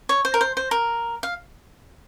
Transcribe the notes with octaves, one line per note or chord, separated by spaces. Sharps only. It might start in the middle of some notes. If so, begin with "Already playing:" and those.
C#5
C5
A#4
C5
C5
A#4
F5